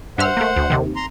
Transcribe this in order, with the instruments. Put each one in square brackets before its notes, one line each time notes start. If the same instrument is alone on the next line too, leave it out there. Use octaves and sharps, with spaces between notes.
[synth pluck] G2 E5 F6 [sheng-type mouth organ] C5 F#5
[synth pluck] A3 A#3
D2
D#2 C3 D#3
[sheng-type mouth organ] A#5 C6